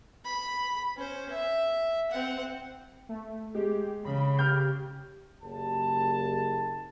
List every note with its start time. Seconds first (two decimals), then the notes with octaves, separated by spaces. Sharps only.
0.25 B5
0.97 C#4 C5
1.31 E5
2.11 C4 F#5
3.09 A3
3.55 G#3 G4
4.05 C#3 B5
4.39 G4 F6 G6
5.43 F#1 G4 A5